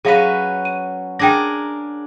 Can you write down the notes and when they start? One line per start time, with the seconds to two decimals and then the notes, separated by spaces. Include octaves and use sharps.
0.05 F#3 C#4 G#4 B4 F5 A#6
0.65 D#7
1.19 D4 G#4 A#4 G5 A#6